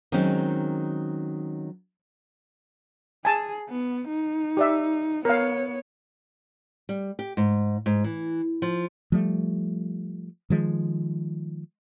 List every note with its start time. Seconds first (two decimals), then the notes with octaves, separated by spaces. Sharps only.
0.12 D#3 F#3 G#3 C4 C#4 D#4
3.25 G#4 G#5 A5
3.69 B3
4.08 D#4
4.57 G4 D5 E5
5.25 B3 A#4 C#5 F5
6.89 G3
7.19 G4
7.37 G#2
7.86 G#2
8.04 E3
8.62 F3
9.12 F3 G3 A3
10.50 D#3 F3 G#3